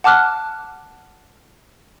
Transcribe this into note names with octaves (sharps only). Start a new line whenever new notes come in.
F#5 A5 D6 F6 F#6